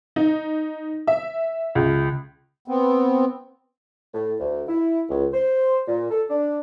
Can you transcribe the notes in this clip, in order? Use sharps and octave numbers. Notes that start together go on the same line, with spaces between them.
D#4
E5
C#2
B3 C4
A2
D2
E4
C#2
C5
A#2
A4
D4